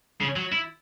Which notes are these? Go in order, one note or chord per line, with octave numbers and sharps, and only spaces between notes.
C#3
F#3
E4